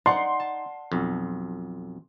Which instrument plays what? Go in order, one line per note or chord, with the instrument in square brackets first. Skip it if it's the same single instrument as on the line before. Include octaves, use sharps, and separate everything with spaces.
[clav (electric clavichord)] D#4 [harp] D5 F#5 [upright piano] C6
[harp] A5
[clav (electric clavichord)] B1 F2